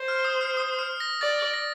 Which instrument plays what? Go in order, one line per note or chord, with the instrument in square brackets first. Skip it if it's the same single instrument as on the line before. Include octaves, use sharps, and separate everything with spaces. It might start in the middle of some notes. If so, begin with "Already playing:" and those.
Already playing: [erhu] C5
[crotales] F6
D#6
F6
D#6
F6
A#6
[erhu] D5 [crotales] A6
[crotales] A#6